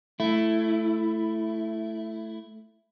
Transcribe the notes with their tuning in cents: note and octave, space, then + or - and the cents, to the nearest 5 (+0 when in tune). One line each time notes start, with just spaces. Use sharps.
A3 +0 E4 +10